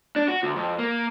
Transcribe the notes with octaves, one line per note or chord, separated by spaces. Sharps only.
D4
F#4
D2
F2
A#3